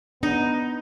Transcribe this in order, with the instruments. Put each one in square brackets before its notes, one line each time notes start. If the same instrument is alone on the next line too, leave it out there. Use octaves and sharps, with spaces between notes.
[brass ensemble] B3 [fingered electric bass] D4 [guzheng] D#4